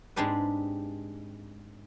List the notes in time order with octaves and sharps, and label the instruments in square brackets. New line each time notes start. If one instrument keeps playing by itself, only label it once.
[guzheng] G#2 G#3 C4 D4 G4 B4